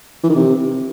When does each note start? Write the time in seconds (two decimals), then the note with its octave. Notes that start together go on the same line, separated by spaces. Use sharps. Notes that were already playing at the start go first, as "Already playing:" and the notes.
0.23 E3
0.29 D#3
0.36 C3